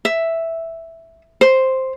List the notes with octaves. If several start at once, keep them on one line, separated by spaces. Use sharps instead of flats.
E5
C5